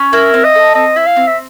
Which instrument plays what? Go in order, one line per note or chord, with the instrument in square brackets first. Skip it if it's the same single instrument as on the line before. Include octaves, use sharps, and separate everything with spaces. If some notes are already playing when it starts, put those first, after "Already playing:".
Already playing: [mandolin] C#4
[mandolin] E4 [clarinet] A#4
[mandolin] C4
[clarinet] D#5
[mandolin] A4
[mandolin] C4 [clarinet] D#5
[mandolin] E4 [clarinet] E5
[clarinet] F5
[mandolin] C4
[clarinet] E5